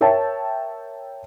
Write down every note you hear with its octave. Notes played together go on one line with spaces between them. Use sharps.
A#4 C#5 E5 G5 A5